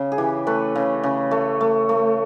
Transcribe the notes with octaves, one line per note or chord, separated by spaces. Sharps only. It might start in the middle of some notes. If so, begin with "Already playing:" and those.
Already playing: C#3
G#4
E3 G4
A3 B4
C#3
C#3
A3
A3
A3